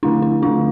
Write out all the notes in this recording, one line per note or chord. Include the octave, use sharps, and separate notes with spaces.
D3 A3 D4 E4
E4
D3 A3 D4 F4